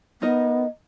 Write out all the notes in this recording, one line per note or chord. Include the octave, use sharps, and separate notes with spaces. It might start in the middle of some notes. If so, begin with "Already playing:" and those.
B3 D#4 A#4 D#5